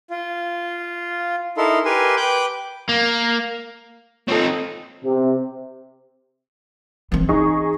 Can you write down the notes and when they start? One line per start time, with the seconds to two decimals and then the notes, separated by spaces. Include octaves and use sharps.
0.11 F4
1.57 D#4 E4 A4 A#4 C6
1.85 G4 A#4 B4 G#5 C6
2.17 B4 G5 D6 F#6 G6
2.89 A#3
4.28 C4 D#4 F4 A4 C#5
5.05 C3
7.12 E3 C4
7.29 D#4 G#4 C#6